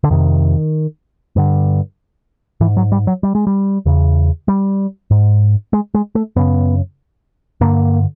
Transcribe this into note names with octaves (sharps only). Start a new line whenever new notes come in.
D3
F2 C3 D#3
G2 D3
G#2 E3
F#3
G3
F#3
G3
G#3
G3
E2 C#3
G3
G#2
G#3
G#3
A3
F#2 C#3 B3
G2 D3 A#3